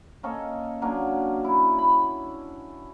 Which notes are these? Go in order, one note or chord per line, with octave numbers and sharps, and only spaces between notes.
A#3 C#4 A4 D#5
F#3 A#3 C#4 D4
E4
B5